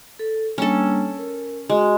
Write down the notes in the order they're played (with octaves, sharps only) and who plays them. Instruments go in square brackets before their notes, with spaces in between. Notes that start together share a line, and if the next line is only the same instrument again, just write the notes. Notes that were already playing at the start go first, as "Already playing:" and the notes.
[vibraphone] A4
[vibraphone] G3 A#3 D4 [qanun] C#4 A4
[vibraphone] A#4
[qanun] G#3 [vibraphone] F#4